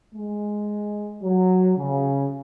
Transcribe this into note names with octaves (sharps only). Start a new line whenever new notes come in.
G#3
F#3
C#3